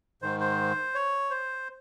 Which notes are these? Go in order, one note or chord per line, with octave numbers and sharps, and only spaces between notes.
G#2 D#3 C5
C5
C#5
C5